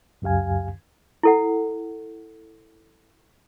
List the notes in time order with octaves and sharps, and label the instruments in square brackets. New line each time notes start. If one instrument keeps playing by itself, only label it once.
[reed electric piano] C#2 F#2 G4 F5 G#5
[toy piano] E4 A4 F#5